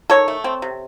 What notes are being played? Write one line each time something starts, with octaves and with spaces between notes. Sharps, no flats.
D#3 A4 C#5
A3
C4
C3